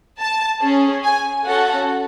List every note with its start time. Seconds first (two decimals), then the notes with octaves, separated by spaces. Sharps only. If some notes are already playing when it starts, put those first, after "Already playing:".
0.19 A5
0.61 C#4 G#4
1.03 G#5
1.45 C#4 F#4 A4 F#5